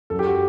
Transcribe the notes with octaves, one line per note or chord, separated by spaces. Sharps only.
F#2 F#3 A4
G4
F#4